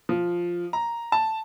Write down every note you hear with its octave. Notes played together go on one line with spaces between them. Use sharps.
F3
A#5
A5